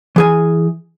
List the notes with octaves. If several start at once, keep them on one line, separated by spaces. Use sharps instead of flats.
E3 G#4 G#5